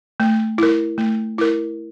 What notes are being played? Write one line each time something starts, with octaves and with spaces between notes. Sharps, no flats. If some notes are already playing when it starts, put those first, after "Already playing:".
A3
E4 A#4
A3
E4 A#4